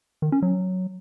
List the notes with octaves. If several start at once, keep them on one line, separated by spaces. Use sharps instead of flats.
D#3
C#4
F#3